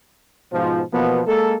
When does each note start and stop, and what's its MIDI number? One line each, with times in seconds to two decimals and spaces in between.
0.53 0.82 44
0.53 0.82 47
0.53 0.82 53
0.93 1.21 47
0.93 1.21 52
0.93 1.21 53
0.93 1.21 58
0.93 1.21 59
1.27 1.55 56
1.27 1.55 58
1.27 1.55 69